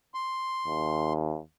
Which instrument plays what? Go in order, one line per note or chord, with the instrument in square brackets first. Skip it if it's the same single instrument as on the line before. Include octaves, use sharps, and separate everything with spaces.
[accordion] C6
[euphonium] D#2